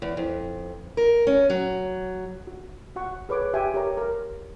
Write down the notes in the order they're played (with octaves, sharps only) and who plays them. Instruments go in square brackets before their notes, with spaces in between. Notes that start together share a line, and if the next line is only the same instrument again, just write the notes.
[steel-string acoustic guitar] E2
F2
A#4
C#4
F#3
[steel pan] F#4
F#4 F#5 C#6
G#4 B4 C#5 D6
G4 E5 G5 G#5
G4 A#4 C#5 A#5
A#4